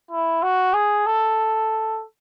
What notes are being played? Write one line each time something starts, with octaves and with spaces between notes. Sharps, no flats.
E4
F#4
G#4
A4